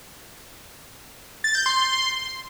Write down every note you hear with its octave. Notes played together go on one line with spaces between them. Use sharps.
A6
G6
C6